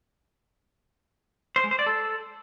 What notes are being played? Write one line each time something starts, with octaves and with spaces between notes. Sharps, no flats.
C5
G#3
C5
D5
A4